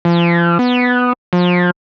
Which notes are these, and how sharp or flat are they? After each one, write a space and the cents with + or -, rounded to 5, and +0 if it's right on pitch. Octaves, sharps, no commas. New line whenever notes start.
F3 -35
B3 +5
F3 +30